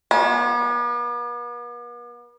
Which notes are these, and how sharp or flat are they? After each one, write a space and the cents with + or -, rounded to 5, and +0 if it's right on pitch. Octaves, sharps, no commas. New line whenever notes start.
B3 -45